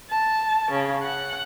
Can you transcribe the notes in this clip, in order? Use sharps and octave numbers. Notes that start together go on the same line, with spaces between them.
A5
C#3
F#5